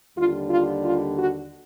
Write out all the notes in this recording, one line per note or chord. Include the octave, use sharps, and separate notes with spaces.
D#2 D3 G3 F4
F4
F4
F#4